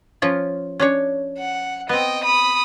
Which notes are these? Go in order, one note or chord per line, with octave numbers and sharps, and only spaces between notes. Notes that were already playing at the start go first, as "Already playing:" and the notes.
F3 C#4 F4
C#4 D4 C#5
F#5
B3 C4 D#5 G5
B5 D#6